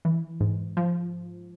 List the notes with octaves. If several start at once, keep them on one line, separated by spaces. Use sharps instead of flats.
E3
G#2
F3